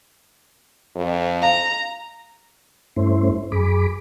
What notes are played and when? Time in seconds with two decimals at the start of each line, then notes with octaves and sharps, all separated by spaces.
0.96 F2
1.42 F5 A#5
2.96 G2 A3 C#4 E4 C5
3.52 F#2 G#4 B5 D6